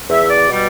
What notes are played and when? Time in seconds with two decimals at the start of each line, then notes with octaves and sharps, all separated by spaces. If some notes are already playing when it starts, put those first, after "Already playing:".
0.09 E2 E5
0.29 D5
0.49 B2 G3